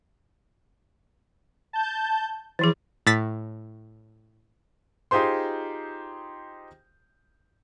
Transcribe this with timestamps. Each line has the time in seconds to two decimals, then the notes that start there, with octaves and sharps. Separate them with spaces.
1.73 A5 G6
2.59 E3 F3 E4 G#4 D6
3.07 A2 A6 B6
5.11 D#4 F4 G4 G#4 C5 C6